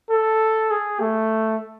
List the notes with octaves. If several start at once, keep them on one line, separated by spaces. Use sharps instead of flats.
A4
G#4
A3